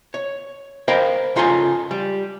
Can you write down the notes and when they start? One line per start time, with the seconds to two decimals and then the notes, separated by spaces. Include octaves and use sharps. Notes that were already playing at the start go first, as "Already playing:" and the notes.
0.14 C#5
0.88 A#4 C5 D#5 F5 G5 B5
1.36 C#3 D#4 F4 A4 G#5 C6
1.91 G3